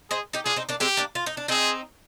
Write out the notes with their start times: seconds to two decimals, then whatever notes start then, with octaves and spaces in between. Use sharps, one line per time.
0.10 G#4 C5 D#5
0.33 D#4 G4
0.45 D4 F4 G#4
0.56 C4 D#4
0.69 A#3 D4
0.80 G#3 C4 G4
0.97 A#3 D4
1.15 F4
1.26 D#4
1.37 D4
1.48 C4 D#4 G#4